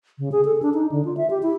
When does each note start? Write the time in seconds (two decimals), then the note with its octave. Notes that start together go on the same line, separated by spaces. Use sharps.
0.19 C#3
0.32 G#4
0.45 A4
0.62 D4
0.74 D#4
0.92 D3
1.05 F4
1.17 E5
1.30 G4
1.43 E4